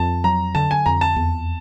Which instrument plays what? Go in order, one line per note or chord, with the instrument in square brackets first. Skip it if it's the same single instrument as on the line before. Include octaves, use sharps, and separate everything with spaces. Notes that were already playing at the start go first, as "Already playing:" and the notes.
Already playing: [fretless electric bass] F2 [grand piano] A5
[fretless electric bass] F#3 [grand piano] A#5
[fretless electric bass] D3 [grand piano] A5
[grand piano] G#5
[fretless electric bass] F2 [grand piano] A#5
[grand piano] A5
[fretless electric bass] E2